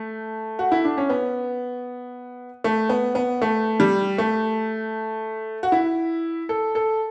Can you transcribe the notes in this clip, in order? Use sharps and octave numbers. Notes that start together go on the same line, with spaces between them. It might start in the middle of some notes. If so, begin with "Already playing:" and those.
Already playing: A3
F#4
E4
D4
C#4
B3
A3
B3
B3
A3
G3
A3
F#4
E4
A4
A4